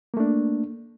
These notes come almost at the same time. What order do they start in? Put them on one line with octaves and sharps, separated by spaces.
A#3 A3 D4